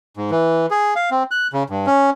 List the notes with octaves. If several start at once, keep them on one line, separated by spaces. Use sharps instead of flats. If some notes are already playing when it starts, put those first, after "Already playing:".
G#2
E3
G#4
F5
C4
F#6
C#3
G2
C#4